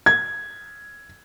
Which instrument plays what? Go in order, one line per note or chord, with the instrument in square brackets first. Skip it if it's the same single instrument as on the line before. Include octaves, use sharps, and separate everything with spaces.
[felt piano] G#6